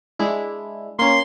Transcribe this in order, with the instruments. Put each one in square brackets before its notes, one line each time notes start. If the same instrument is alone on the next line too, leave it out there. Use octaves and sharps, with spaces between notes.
[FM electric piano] G#3 D4 E4
[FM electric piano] A#3 C#4 [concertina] C6